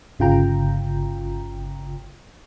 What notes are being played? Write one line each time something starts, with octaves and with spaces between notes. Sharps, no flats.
G1 C#3 F4 G5 A#5